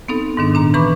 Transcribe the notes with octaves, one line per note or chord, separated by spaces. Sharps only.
B3 C4 D#4 A4
G#2 D#3 D4
A#2 D4 A#5
E3 B4 A#5 B5 C#6 D6